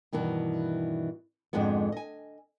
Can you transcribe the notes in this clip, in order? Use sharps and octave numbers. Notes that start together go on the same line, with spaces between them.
G2 B2 D#3 E3
F2 G#2 D3 G#3 B3
D#5 G#5